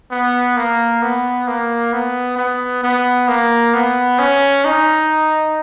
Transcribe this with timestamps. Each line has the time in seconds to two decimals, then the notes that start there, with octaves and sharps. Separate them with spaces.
0.11 B3
0.57 A#3
1.02 B3
1.47 A#3
1.93 B3
2.37 B3
2.83 B3
3.28 A#3
3.74 B3
4.19 C#4
4.65 D#4